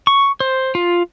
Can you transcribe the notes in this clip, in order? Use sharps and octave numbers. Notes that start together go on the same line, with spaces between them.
C#6
C5
F4